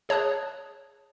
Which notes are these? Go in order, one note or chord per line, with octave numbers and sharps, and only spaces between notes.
G#4 C#5 A5 D#6 F#6